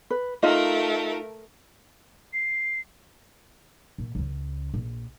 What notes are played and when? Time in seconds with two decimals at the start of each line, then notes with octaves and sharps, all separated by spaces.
0.10 B4
0.43 A3 D#4 F4 A#4 D#5
2.33 C7
3.98 A#2
4.15 C#2 C#3
4.74 A#1